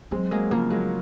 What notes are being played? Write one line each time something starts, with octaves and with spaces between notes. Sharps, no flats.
F#3 G#3 C4
F#3 G#3 A#3
C#3 F3 A#3
F#3 G#3 A#3